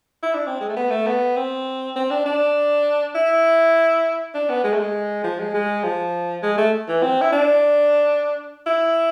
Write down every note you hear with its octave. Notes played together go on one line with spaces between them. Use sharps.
E4
D4
C4
G#3
A3
B3
A3
B3
C4
C4
D4
D4
E4
D4
B3
G#3
A3
G#3
F3
G#3
G#3
F3
G#3
A3
E3
C4
E4
D4
E4